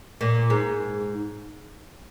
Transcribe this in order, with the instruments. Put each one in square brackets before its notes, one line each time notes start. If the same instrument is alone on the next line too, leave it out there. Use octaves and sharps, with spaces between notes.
[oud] A#2
G#2